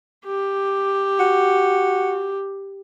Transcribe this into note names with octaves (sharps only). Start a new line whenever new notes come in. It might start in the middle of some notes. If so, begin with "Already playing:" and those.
G4
F#4